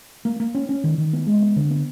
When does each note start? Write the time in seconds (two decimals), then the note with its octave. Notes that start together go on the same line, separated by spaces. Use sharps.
0.25 A#3
0.40 A#3
0.55 C#4
0.69 C#4
0.84 D#3
0.98 D#3
1.13 B3
1.27 G#3
1.42 B3
1.56 D3
1.70 B3